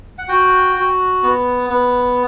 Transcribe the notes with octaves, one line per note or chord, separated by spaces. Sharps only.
F#5
F#4 G5
F#4
B3
B3